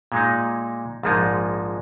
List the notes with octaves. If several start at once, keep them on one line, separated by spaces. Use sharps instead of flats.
A#2 G#3 D#4
A#1 G#2 F3 G#3 D#4